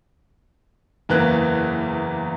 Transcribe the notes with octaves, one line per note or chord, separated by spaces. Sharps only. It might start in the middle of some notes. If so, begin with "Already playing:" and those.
F#1 E2 E3 A#3 F#6